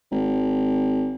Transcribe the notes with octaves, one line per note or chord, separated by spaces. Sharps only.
G#1